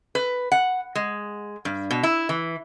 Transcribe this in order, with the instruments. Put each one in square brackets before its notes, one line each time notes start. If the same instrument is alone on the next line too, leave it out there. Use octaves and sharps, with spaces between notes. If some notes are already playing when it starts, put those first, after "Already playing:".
[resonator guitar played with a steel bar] B4
F#5
G#3
G2
B2
E4
E3